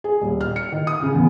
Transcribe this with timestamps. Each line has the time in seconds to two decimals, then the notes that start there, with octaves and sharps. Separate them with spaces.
0.04 G#4
0.21 D#1
0.41 F6
0.56 C#7
0.72 D#3
0.87 D#6
1.02 C#3
1.15 E2